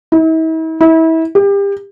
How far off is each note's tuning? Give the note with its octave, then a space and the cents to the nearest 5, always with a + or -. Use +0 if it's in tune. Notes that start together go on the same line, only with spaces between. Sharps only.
E4 -45
E4 -30
G4 +30